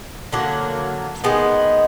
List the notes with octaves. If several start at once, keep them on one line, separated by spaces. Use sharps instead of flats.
D3 F#3 A#3
D#3 G#3 B3